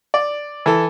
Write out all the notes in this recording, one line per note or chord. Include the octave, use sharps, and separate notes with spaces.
D5
E3 A4